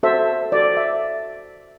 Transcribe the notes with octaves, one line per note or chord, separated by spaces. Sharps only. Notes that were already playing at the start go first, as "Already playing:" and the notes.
F#4 A4 C5 E5
F#4 A4 C5 D5
E5